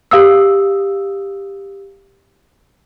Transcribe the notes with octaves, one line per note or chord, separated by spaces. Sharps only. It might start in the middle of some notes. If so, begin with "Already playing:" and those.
G4 F5 D#6 E6